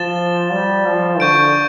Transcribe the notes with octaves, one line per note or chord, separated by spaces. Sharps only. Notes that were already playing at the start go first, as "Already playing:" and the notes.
Already playing: F3 A6 E7 G7
G3
F3
D3 C#6 G6 D7